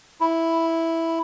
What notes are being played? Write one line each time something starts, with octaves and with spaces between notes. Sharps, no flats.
E4